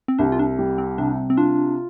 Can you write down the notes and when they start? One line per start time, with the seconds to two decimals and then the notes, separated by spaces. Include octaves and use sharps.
0.08 C4
0.19 C2 D4
0.32 F4
0.39 D4
0.59 G3
0.78 C4
0.98 C3 D4
1.30 C4
1.37 D4 F4